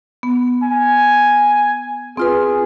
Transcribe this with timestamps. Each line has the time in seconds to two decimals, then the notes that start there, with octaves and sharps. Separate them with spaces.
0.23 B3
0.63 G#5
2.17 C4 F4 G#4 B4